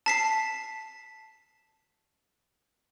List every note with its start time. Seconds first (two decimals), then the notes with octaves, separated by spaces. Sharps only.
0.06 A5 B6 C7